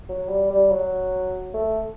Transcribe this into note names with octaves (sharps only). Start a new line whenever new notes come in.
F#3
G3
G3
F#3
A3